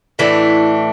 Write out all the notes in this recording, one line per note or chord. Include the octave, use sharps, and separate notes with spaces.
A2 E3 A3 D4